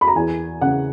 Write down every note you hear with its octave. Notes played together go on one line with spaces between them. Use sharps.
B5
A#5
E2 G#5
C#3 F#5